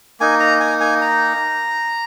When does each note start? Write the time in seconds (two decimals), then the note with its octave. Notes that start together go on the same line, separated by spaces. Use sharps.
0.20 A#3 D#4 G#5
0.40 A#5
0.60 G#5
0.80 G#5
1.02 A#5